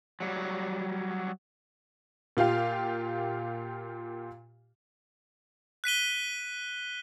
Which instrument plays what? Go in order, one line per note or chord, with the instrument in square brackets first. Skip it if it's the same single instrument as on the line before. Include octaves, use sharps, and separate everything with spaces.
[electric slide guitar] F#3 G3
[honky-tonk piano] A#2 F4 G4 F5
[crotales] F#6 B6 D#7 G7